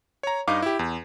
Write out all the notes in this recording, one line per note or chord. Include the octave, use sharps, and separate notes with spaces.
C#5 A#5
G2 D#4 F5 D6
E4 G4
E2